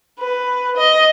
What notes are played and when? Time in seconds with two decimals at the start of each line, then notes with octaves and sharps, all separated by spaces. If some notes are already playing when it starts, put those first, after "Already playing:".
0.20 B4
0.77 D#5